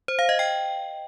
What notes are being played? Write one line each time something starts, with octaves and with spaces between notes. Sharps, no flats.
C5
F5
D#5
G5